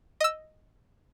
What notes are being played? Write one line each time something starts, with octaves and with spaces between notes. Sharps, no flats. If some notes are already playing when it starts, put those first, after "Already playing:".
D#5 E6